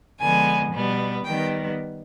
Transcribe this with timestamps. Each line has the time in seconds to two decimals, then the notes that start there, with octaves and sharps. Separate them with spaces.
0.21 D3 F3 G#3 B3 G#5
0.73 B2 G3 B3
1.24 D#3 G3 B3 G5